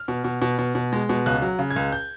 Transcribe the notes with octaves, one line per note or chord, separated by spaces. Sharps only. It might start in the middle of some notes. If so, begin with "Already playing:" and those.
Already playing: F6
B2
B2
B2
B2
B2
G#3
B2
C#2 F#6
F#3
C#3
G#6
C#2
G6